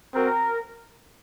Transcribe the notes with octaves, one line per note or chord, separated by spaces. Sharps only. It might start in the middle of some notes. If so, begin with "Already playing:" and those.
C4 F#4 A#4